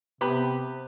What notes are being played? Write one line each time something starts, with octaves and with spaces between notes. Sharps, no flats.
C3 B3 G4 B5